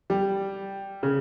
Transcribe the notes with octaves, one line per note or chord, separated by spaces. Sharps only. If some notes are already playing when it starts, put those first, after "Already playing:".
G3
C#3